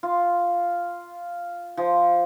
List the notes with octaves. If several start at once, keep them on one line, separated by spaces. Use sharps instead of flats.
F4
F3